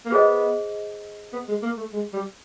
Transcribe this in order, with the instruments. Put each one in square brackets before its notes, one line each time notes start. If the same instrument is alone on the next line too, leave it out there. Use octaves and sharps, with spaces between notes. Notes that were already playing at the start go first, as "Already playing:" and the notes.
[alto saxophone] A#3
[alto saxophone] B3 [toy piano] G#4 C5 D#5
[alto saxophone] B3
G#3
A#3
A3
G#3
G3